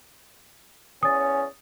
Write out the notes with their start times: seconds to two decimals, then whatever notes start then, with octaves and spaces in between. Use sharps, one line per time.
1.03 E2 C#4 D#6 A6